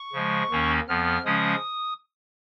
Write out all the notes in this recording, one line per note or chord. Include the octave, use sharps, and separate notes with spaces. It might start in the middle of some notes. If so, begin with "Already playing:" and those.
Already playing: C#6
C#3 F3 G#3
D#2 D#3 A#3 C#4
F2 F3 B3 F6
C#3 F3 G#3 C#4 D#6